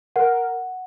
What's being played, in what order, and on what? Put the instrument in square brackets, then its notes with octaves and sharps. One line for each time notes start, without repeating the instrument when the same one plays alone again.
[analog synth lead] A#4 [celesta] F#5